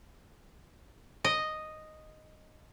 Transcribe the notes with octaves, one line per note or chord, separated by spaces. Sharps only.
D#5